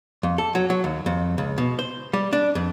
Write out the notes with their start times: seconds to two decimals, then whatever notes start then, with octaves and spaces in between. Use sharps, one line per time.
0.23 F2
0.38 A4
0.55 F#3
0.70 F#3
0.84 D#2
1.06 F2
1.38 C#2
1.58 B2
1.79 C5
2.13 G3
2.33 D4
2.55 F2